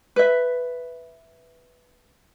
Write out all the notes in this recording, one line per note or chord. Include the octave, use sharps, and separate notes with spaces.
B4 E5